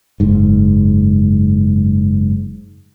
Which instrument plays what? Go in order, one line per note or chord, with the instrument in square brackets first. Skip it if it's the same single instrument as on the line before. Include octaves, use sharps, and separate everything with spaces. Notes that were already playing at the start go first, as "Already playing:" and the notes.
[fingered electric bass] F#1 G#2